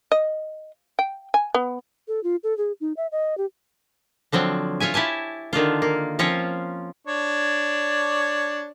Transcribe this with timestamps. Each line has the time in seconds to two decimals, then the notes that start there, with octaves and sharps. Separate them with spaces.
0.12 D#5
0.99 G5
1.34 G#5
1.54 B3
2.08 A4
2.24 F4
2.44 A4
2.58 G#4
2.81 D#4
2.97 E5
3.12 D#5
3.38 G4
4.32 D3 F3 F#3 C4
4.80 F4 C#5 E5 G#5
4.94 E4 G4 G#5 A5
5.53 D3 D#3 D4 F4
5.82 A#3
6.19 F3 C4 C#4 F4 C#5
7.07 D4 C#5